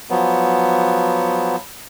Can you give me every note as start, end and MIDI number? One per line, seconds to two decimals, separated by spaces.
0.10 1.56 53
0.10 1.56 54
0.10 1.56 59